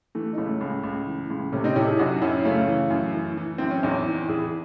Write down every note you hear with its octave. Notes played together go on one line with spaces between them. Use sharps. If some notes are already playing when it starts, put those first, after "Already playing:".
E3 A3
D#4
C#2 A3 C#4
C#2
C#2
E3
C#2
C3 A3 C#4
C4 D#4
C3 C#4 E4
A4
E4 G#4
F#2 D#4 F#4
F#2 C#4 E4
C#3 A3 C#4
E3
F#2
E3
E3
F#2 C4
C#4
E2 C4 D#4
E3
E2 E4 G#4